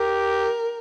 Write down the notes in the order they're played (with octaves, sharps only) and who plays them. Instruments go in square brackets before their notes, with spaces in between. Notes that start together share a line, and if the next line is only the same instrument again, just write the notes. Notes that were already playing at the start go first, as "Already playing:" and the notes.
Already playing: [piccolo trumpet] G4 [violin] A#4